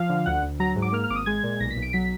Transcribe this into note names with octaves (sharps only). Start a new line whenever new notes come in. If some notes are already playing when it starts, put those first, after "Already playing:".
Already playing: F3 F5
D3
D2 F#5
D2
F#3 A#5
G#2
D6
A#3 F6
F6
G#1 D6
D#6
G#3 G#6
A#2
B1 A#6
B6
B1
D7
F#3 B6